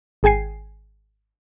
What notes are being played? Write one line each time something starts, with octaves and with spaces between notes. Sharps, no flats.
G#1 G#4 G5 G#5 C7